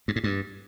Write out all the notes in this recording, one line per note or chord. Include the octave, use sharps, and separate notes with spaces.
G2
G#2
G2